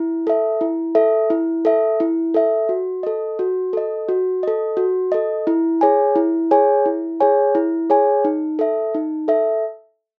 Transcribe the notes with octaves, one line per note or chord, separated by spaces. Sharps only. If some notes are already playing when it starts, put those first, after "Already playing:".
Already playing: E4
A4 E5
E4
A4 E5
E4
A4 E5
E4
A4 E5
F#4
A4 D#5
F#4
A4 D#5
F#4
A4 D#5
F#4
A4 D#5
E4
G#4 C#5 G#5
E4
G#4 C#5 G#5
E4
G#4 C#5 G#5
E4
G#4 C#5 G#5
D#4
A4 E5
D#4
A4 E5